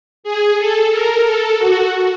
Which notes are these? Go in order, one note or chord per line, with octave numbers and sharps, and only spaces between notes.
G#4
A4
A#4
A4
F#4